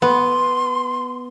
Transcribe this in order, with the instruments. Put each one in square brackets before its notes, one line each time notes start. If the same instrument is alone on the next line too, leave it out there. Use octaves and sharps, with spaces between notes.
[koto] B3 [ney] C6